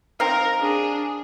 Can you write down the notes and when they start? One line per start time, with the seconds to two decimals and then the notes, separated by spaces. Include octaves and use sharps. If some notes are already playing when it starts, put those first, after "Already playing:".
0.20 C4 D#4 A#4 F5
0.59 D4 G#4